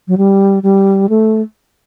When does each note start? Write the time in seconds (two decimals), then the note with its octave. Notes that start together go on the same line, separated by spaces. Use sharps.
0.08 F#3
0.18 G3
0.63 G3
1.09 A3